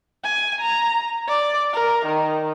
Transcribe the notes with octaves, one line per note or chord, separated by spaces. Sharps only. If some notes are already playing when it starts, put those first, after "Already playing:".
G#5
A#5
D5
A#4
D#3